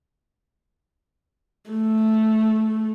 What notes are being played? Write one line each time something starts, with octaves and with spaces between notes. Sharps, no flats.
A3